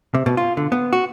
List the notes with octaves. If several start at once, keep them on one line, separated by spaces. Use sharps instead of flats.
C3
B2
F4
D3
B3
F#4